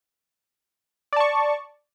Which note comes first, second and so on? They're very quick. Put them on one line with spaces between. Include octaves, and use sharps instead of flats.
D5 A5 C#6